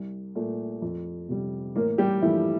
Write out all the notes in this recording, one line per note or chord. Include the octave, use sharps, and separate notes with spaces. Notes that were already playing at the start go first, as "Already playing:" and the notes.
Already playing: C2
A#2 A3
F2
C3 G3
A1 A#3 A#4
G3 G4
G2 E3 F3 A3 E4